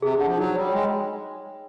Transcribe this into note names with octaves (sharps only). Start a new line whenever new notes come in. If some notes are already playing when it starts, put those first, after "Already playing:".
C3 G#4
D3
F#5
F3
F#3 D#4
G3 C#5
G#3 G5